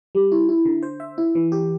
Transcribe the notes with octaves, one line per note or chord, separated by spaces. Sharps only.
G3
E4
E4
D3
C5
E5
E4
E3
G4